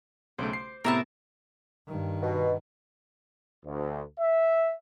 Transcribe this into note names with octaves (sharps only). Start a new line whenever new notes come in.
B1 C#3 A3 C5 D6
C7
A2 C3 B3 A#4 E5 A5 B5
G2 D#3
B2
D2
E5